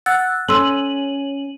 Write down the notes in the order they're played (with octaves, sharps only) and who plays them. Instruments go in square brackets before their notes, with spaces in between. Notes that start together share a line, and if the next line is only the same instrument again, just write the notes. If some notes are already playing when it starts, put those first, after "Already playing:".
[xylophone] F#5 [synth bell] E6 F#6 A6
[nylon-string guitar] C#4 [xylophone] A4 C6 E6 [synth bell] D#7 F#7